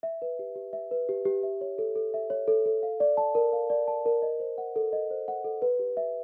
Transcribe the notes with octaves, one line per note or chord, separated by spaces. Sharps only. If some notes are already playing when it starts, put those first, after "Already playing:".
E5
B4
G4
G4
E5
B4
G4
G4
E5
C#5
A4
A4
E5
C#5
A4
A4
F5
D5
A5
A#4
F5
D5
A5
A#4
D#5
C5
F#5
A4
D#5
C5
F#5
A4
B4
G4
E5